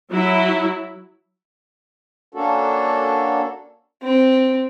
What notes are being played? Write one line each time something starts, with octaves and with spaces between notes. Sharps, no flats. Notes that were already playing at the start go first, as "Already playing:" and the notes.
F#3 E4
A#3 C#4 D4 F#4 A4
C4